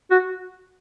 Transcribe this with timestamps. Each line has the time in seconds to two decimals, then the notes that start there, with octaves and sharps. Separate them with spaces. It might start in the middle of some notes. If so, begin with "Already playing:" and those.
0.10 F#4